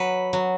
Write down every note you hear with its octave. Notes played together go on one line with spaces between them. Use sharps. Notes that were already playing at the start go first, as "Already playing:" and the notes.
Already playing: F#3 B4
F#3